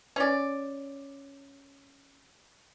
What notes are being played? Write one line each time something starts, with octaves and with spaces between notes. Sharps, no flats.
C#4 D5